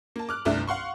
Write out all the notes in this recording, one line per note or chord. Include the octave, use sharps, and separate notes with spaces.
A#3 A5
D6 F6 F#6
G1 C2 A3 D4 E5
F5 F#5 C6 C#6